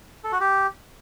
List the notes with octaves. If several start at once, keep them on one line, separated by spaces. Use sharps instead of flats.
A4
F#4
G4